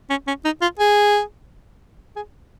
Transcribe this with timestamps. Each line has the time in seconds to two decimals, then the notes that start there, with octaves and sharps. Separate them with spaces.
0.10 C#4
0.27 C#4
0.45 D#4
0.62 F4
0.79 G#4
2.16 G#4